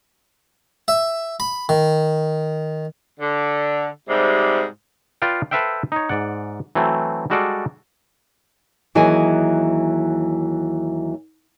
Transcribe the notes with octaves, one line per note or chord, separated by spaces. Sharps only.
E5
B5
D#3
D3
G#2 C3 G3 G#3
F4 B4 D5 F5 G5
A4 B4 C5 E5 F5 G5
D#4 C#5
G#2 D5 F#5
E3 F#3 A3 C4
G3 G#3 F#4 A4 D5 F5
D#2 E3 F#3 G#4 D#5 G#5